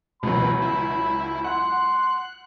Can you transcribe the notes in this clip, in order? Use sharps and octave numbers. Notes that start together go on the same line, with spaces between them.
C#2 B2 E3 F#3 B5
E4
F#5 C6 F#6